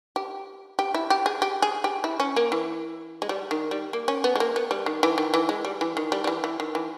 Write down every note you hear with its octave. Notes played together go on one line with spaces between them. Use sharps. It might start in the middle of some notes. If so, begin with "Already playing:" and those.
G4
G4
E4
G4
G#4
G4
G#4
G4
E4
C#4
A#3
E3
G#3
G3
D#3
G3
A#3
C#4
B3
G#3
A#3
B3
G3
D#3
E3
D#3
E3
G#3
G3
E3
D#3
G3
G3
E3
E3
D#3
E3